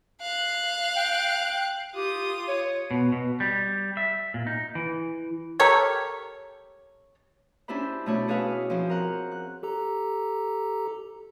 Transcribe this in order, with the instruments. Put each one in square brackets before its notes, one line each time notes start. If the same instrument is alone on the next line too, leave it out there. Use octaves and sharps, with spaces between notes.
[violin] F5 F#6
[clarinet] G5
[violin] F4 D#6 [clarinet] G4
[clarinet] C#5
[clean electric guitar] B2
B2
G3
E5
A#2
D#4
E3
[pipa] G4 A4 A#4 C#5
[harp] C#4 D4 E4 G4 C5 B5
B2 A3 D4 C#5 B5
E4 G#4 B4 C#5 F5
F3 C4 C#4 C5
A#4 F#5
F#6
[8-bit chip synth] G4 A4 A#5